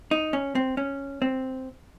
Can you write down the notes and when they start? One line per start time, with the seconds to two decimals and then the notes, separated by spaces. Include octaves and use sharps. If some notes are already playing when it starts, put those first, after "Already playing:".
0.11 D#4
0.33 C#4
0.55 C4
0.77 C#4
1.22 C4